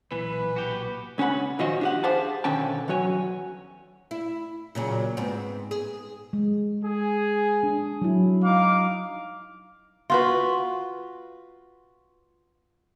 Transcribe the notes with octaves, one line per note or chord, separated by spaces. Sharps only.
B1 A#2 E3 A#3 B4
F#4 G4
C#2 C#4 D4 F#5 B5
A#2 D#3 F3 C#4 F#4 D#5
D4 G4 F#5
G4 G#4 C5 F5 F#5 A5
B2 D3 D#3 C#4 G5 A5
E2 F#3 F#4 C#5 G#5
E4
A#2 C#3 F#3
G#2 B3 C4
G#4
G#3
G#4
D4
F#3 E4
D#4 F5 D6
F4 F#4 B4